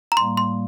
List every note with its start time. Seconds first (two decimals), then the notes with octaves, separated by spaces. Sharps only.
0.12 A#5
0.17 A2 G3 A#3 C6
0.37 C6